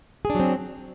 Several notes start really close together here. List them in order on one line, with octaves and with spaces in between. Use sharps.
G#4 D4 F#3 C4